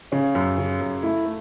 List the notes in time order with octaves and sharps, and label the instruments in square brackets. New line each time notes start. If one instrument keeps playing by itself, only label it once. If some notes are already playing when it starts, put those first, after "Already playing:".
[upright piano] C#3 [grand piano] C#4
[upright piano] F#2
C#3
F#2
[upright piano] A3 [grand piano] E4
[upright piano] A3